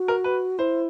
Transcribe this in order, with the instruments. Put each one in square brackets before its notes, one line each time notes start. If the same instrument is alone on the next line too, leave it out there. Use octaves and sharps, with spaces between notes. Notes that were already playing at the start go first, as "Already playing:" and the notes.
Already playing: [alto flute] F#4
[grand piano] A#4
B4
[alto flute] E4 [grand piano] C5